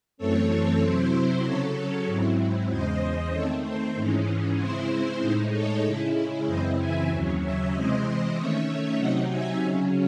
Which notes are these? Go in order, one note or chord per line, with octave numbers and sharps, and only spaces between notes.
F#2 E3 A3 C4 A4 C#5
C3 F#3 C4 E4 C5
C#3 F#3 C#4 A4 C#5
G#2 F#3 C4 E4
E2 C#3 G#3 C5 D#5
D#3 A3 C4 A4 C#5
C5
G#2 E3 G#3 C#4
C#3 G#3 C4 E4 C5
A2 G#3 D#4 C5
A4 C#5
C#3 G#3 C#4 E4
F#2 C#3 E3 C4 E4 C5 D#5
E5 G#5
D#2 C#3 F#3 C#4
C#5 E5
C3 E3 G#3 C4 C5 D#5
D#3 A3 C#4 C#5 E5
C3 F#3 C4 D#4 D#5 F#5
E5 G#5
C#3 F#3 C#4